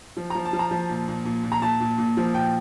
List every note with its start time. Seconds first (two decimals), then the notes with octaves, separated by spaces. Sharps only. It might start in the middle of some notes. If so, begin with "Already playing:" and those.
0.17 F3
0.30 F3 A#5
0.45 A5
0.53 F3
0.59 A#5
0.71 F3
0.89 A#2
1.08 A#2
1.25 A#2
1.43 A#2
1.52 A#5
1.61 A#2 A5
1.80 A#2
1.98 A#2
2.17 F3
2.34 A#2 G5